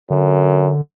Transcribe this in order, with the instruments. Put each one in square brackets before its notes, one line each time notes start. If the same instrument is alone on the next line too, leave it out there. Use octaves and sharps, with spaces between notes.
[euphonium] F#2 [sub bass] D3